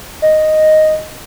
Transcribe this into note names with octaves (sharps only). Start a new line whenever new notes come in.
D#5